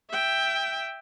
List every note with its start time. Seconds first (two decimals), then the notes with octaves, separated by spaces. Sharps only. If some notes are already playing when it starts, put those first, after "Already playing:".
0.10 E5 G5